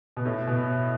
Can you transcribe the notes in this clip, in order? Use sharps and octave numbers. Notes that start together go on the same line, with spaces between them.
B2
A2
B2